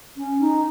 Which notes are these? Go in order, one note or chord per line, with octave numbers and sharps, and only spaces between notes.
C#4
D#4